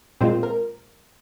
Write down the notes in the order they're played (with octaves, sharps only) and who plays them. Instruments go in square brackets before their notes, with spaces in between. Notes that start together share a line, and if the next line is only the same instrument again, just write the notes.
[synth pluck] A#2 G#3 C4 F4 C5
A#4